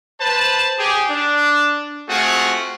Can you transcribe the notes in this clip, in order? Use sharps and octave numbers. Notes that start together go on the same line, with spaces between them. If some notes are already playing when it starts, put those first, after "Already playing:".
B4 C5 A5
G4 G#4
D4
A3 C4 F4 F#4 G#4